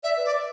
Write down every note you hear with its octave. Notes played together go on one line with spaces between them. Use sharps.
D5 E5
B4
D5
B4